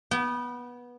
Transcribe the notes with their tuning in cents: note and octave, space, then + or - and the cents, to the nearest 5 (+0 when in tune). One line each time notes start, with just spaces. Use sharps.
B3 -15 G5 -40